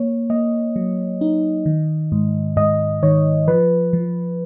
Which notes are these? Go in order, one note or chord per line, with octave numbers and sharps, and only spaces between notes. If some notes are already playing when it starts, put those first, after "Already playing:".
Already playing: A#3 C#5
A#3 D#5
F#3
D#4
D#3
G#2
G#2 D#5
D#3 C#5
F3 B4
F3